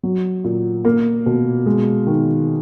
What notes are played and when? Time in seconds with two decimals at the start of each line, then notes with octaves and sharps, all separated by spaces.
0.03 F#3
0.44 A#2
0.85 A#3
1.26 B2
1.66 G#3
2.07 D#3